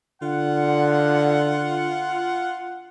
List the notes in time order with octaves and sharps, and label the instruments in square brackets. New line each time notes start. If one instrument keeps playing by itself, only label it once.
[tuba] D3 [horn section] F4 F#5